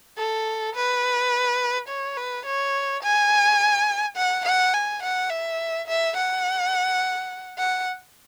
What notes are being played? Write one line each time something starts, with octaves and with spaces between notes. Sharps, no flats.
A4
B4
C#5
B4
C#5
G#5
F#5
F#5
G#5
F#5
E5
E5
F#5
F#5